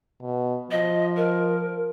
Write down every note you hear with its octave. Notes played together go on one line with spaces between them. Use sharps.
B2
F3 D#5
A#4